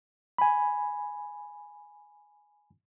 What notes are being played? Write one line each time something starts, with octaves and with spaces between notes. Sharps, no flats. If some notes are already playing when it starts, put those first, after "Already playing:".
G#5 B5